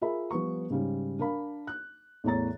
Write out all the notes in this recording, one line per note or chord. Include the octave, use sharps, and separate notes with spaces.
F4 G#4 A#4 E5 B5
F3 G3 B3 C#6
G#2 C#3 G3
D4 A#4 F5 B5
F#6
E2 A2 C#5 A#5 A6